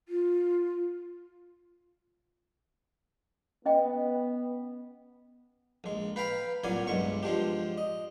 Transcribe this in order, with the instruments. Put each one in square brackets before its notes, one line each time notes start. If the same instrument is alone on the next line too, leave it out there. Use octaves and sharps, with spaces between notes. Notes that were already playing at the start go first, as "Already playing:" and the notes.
[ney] F4
[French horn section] B3 [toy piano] C#4 D#5 G5
[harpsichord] A#1 G#3
B4 F5 G5 A#5 B5
C2 A#2 F#3 D5 G#5
B1 G2 G#3 C#6
F3 G#3 D4 G4
D#5